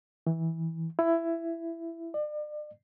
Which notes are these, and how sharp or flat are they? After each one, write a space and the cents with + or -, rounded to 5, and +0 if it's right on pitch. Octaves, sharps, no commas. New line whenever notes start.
E3 -15
E4 +15
D5 +40